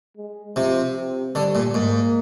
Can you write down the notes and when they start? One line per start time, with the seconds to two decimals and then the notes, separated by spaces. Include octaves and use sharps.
0.17 G#3
0.56 C3 F3
0.95 C3
1.34 D3 G3
1.55 A#2
1.74 G#2 A#3